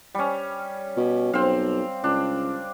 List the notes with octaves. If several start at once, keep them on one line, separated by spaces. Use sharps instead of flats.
G3 C#4
B2
B1 C4 F5
C#2 D4